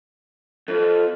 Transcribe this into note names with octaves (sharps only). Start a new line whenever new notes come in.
F2 A4